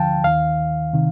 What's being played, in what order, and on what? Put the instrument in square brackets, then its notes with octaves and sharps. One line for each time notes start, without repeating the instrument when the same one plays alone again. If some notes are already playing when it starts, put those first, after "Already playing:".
Already playing: [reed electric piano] D2 D3 F3 F5 G5 A5
D#2 D#3 F5
C3 D#3